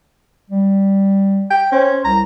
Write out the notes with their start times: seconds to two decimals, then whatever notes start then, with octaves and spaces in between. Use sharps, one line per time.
0.50 G3
1.51 G5
1.72 C#4 C5
2.05 C2 A#5